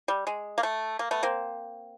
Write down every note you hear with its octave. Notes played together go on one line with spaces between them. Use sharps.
G3
G#3
A#3
A3
A#3
A3 B3
A#3 C4